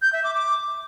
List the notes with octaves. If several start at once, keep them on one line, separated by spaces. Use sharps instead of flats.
G6
E5
D6
D6